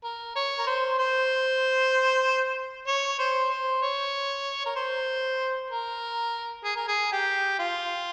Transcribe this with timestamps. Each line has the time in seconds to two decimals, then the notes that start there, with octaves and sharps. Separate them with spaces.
0.04 A#4
0.36 C#5
0.58 A#4
0.67 C5
0.98 C5
2.87 C#5
3.19 C5
3.50 C5
3.82 C#5
4.66 A#4
4.76 C5
5.70 A#4
6.64 G#4
6.76 A#4
6.88 G#4
7.12 G4
7.59 F4